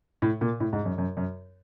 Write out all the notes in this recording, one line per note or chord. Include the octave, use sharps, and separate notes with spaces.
A2
A#2
A2
G#2
F#2
F#2
F#2